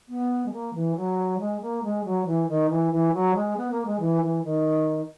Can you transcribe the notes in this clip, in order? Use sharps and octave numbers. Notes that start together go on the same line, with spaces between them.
B3
G#3
A#3
E3
F#3
G#3
A#3
G#3
F#3
E3
D#3
E3
E3
F#3
G#3
B3
A#3
G#3
E3
E3
D#3